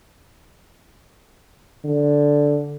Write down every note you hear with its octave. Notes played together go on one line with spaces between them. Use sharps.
D3